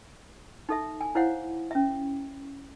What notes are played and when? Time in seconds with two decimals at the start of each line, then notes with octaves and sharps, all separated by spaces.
0.69 D#4 A4 E5
1.01 G#5
1.15 E4 C5 C#5 F5 F#5
1.71 C#4 E5